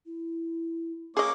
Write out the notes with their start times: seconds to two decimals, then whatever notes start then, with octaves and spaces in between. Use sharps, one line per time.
0.06 E4
1.17 A#3 G#4 C#5 D#5 D6